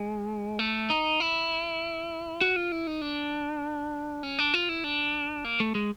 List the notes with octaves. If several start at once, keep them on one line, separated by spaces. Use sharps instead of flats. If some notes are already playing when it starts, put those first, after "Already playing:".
Already playing: G#3
A3
D#4
E4
F#4
F4
E4
D#4
D4
C#4
D4
F4
E4
D4
A#3
A3
G#3